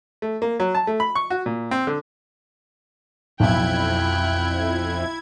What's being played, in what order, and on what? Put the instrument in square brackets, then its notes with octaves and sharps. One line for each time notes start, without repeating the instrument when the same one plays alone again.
[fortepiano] A3
A#3
F#3
A5
A3
B5
C#6
F#4
A#2
C4
D3
[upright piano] B1 [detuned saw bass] F2 [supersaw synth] E4 G#6 [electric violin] G5 F#6